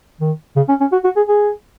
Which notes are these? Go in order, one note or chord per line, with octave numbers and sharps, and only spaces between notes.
D#3
C#3
C#4
C#4
F#4
F#4
G#4
G#4